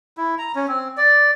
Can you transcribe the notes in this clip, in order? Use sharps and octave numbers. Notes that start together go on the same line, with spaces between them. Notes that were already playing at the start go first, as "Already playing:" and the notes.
E4
A#5
C#4
C4
D5